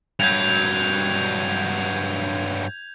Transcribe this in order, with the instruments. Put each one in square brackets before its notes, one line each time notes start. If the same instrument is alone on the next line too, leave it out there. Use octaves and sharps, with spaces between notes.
[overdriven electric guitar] G2 F#3 [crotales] G6 G#6 F7